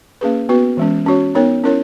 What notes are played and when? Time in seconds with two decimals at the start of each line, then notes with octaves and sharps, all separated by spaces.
0.21 A#3 C#4 G#4 B4
0.49 B3 F#4 B4
0.77 E3 G#3 C#4
1.06 C#4 F#4 C#5
1.35 B3 D#4 A#4 C#5
1.64 C#4 E4 A#4 C#5